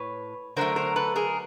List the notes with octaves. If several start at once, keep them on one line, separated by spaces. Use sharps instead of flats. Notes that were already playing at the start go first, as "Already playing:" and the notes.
Already playing: A2 B4 C#5
D3 F#3 A3 A#4 C5
A#4 C5
A4 B4
G#4 A#4